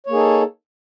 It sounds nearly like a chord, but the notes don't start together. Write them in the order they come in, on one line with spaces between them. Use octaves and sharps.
C#5 A#3 G#4 D#4 A4